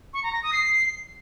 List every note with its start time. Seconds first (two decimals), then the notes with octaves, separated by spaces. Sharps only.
0.14 C#6
0.23 A#5
0.33 A#6
0.43 D#6
0.53 C7